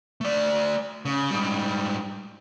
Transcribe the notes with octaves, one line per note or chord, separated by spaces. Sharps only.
A3 D5
C#3
G#2 G3